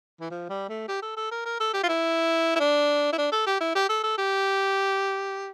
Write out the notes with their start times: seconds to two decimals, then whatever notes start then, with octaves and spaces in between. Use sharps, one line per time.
0.21 E3
0.31 F3
0.50 G3
0.69 A3
0.88 G4
1.02 A4
1.17 A4
1.31 A#4
1.46 A#4
1.60 A4
1.74 G4
1.83 F4
1.89 E4
2.55 E4
2.60 D4
3.13 E4
3.18 D4
3.32 A4
3.47 G4
3.61 E4
3.75 G4
3.89 A4
4.04 A4
4.18 G4